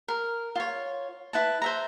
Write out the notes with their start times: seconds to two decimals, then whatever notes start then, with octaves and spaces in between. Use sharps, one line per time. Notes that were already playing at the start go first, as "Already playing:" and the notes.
0.08 A#4
0.55 F4 C#5
1.33 E4 B4 A5
1.62 C5 E5 A#5